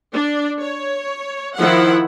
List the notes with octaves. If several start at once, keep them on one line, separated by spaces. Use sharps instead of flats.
D4
C#5
D#3 F3 E4 F#5